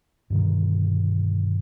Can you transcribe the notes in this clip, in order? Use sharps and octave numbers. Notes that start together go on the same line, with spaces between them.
G2 B2 D3 D#3